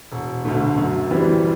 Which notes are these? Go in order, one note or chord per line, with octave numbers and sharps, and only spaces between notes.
E1
D2 D3 A3
F#2
E3 G3 C4